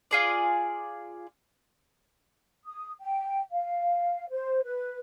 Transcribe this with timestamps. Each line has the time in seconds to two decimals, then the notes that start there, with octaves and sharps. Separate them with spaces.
0.11 F4 G#4 D5
2.66 D#6
3.01 G5
3.51 F5
4.31 C5
4.64 B4